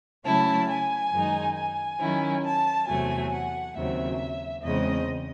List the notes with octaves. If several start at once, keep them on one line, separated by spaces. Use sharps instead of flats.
C#3 F#3 A3 C#4 E4 A5
G#5
F#2 D#3 G#3 D#4
G#5
D#3 F#3 C#4 E4
A5
E2 C3 F#3 A3 G#5
F#5
D#2 C#3 F#3 C4 E5
E2 C#3 G#3 C4 D#5